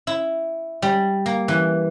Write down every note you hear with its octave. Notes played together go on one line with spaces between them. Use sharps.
E4
G3
A#3
E3